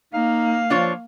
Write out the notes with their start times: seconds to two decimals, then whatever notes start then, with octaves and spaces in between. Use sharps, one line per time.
0.14 A#3 D#4 F5
0.70 F3 D4 F4 C#5